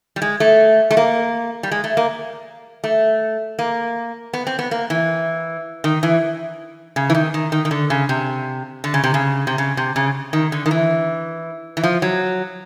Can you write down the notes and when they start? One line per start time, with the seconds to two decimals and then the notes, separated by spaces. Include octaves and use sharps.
0.16 G3
0.22 G#3
0.40 A3
0.91 A3
0.97 A#3
1.63 G3
1.71 G#3
1.84 A3
1.97 A#3
2.84 A3
3.59 A#3
4.33 B3
4.47 C4
4.59 B3
4.71 A#3
4.90 E3
5.84 D#3
6.03 E3
6.96 C#3
7.10 E3
7.15 D#3
7.34 D#3
7.52 D#3
7.65 D#3
7.71 D3
7.90 C#3
8.09 C3
8.84 D3
8.94 C#3
9.04 C3
9.14 C#3
9.47 C3
9.58 C#3
9.77 C3
9.96 C#3
10.33 D#3
10.52 D3
10.66 D#3
10.71 E3
11.77 E3
11.84 F3
12.02 F#3